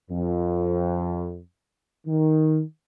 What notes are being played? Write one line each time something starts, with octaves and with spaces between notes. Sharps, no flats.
F2
D#3